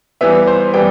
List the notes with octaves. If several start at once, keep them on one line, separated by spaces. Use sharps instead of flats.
E3 G3 B3 E5
C5
E3 G3 B3 G5